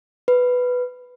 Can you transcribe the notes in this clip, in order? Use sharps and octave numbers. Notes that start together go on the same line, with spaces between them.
B4